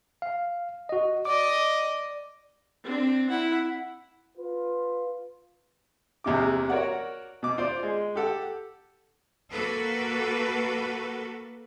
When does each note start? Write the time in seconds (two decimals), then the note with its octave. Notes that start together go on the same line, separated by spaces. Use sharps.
0.22 F5
0.89 F#4 D#5
1.25 D5 D#5 D6
2.84 C4 D4
3.30 E4 F#5
4.37 F4 B4
6.24 A#1 E2 C3 D6
6.70 F#4 A#4 C#5 D5 F#5
7.43 B2 D6
7.57 F4 C5 D5
7.83 G#3
8.16 G4 A4 F#5
9.52 A#3 F#4 A4 B4